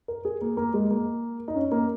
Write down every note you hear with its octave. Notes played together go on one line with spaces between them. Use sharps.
A#4
G#4
A#3
A#3
G#3
A#3
D#4
C#4
A#3